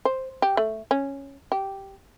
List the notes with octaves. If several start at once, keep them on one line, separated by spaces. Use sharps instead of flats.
C5
G4
A3
C#4
G4